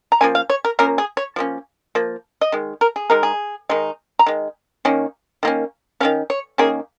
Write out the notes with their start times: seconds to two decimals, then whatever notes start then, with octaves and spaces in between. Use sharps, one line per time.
0.12 A#5
0.21 F3 A#3 C#4 G#5
0.35 F5
0.50 C#5
0.65 A#4
0.79 F3 A#3 C#4 A#4
0.98 G#4
1.17 C#5
1.36 F3 A#3 C#4
1.95 F3 A#3
2.41 D#5
2.52 D#3 G#3
2.81 A#4
2.96 G#4
3.10 D#3 G#3 D#4 A#4
3.23 G#4
3.69 D#3 G#3 D#4
4.19 A#5
4.26 D#3 G#3
4.85 D#3 A#3 C#4
5.43 D#3 A#3 C#4
6.00 D#3 A#3 C#4 F5
6.30 C#5
6.58 D#3 A#3 C#4 G#4